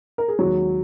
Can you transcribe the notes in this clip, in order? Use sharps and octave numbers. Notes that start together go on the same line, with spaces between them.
A#4
G#4
D#2 D#3 F#3 G#3 F#4